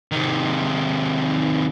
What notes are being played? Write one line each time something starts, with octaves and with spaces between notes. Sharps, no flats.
C3 D#3